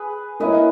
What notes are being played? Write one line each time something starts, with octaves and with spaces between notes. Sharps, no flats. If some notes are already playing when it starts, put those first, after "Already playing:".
Already playing: G#4 B4
A#3 E4 A#4 B4 C#5 D#5 E5